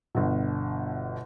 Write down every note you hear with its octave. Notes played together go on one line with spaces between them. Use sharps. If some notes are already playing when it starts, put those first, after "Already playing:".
G1 B2